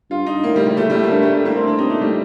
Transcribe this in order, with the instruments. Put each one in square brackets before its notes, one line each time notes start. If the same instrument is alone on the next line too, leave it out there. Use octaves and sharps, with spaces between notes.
[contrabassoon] G2 [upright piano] F4
[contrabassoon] G2 [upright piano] D#4
[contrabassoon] A2 [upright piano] A#3
[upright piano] G3
G3
[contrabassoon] A#2 [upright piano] A3
[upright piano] G3
[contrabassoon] A2 [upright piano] A3
[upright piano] A#3
[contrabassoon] G2 [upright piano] A3
[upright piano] A3
A3
[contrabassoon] A2 [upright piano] A#3
[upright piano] C4
D4
[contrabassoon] C3 [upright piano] D#4
[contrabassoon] A#2 [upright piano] A3
[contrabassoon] A2 [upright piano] G3